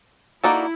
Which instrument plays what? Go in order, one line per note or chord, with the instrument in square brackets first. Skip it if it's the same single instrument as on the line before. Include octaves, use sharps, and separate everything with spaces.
[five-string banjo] A#3 D#4 F#4 A4 D5 [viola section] E4